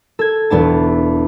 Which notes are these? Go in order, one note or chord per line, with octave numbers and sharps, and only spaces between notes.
A4 G#6
E1 E2 B3 D4 A5